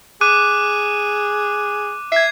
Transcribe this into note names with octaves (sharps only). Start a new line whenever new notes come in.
G#4 D6 F#6 D#7
E5 G#6 C7